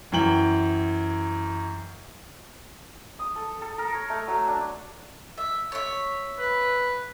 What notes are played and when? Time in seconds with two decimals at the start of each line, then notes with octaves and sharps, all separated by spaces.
0.12 F#2 E3 G5 F#7
3.19 D#6
3.36 A4
3.62 A4
3.78 A#4
3.94 C#5
4.10 A3
4.28 F#3
4.48 D4
5.38 E5
5.72 C#5 E5
6.39 B4